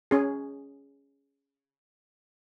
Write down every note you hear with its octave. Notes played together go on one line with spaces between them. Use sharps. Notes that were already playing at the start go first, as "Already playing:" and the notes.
C#4 G#4